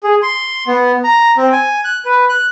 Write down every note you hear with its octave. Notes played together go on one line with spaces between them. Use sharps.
G#4
C6
B3
A#5
C4
G#5
F#6
B4
F#6